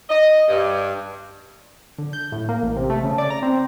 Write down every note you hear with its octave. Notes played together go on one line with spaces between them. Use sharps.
D#5
G2
D3
G6
A2
A#3
A1
C3
A3
C#3
D5
A#5
C4